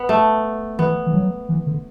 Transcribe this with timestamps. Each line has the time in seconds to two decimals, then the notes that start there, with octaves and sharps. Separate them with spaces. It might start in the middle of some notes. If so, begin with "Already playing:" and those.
Already playing: B3
0.09 A3
0.79 E3 B3
1.06 E3
1.14 F#3
1.49 E3
1.66 D3